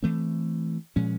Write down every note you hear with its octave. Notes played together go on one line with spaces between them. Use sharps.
E3 A3 C4
A#2 F3 G#3 C#4